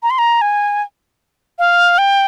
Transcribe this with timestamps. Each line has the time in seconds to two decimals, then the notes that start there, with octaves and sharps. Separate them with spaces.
0.03 A#5
0.10 C6
0.19 A#5
0.41 G#5
1.59 F5
1.98 G5